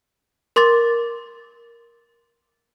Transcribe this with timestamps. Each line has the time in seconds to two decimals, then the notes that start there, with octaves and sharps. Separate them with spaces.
0.56 A#4 C6 D6 A6